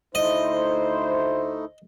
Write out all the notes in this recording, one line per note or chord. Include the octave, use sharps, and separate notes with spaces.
D2 A3 D#4 E4 C5 D#5